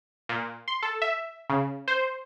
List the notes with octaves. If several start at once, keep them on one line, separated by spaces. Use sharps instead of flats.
A#2
C6
A4
E5
C#3
C5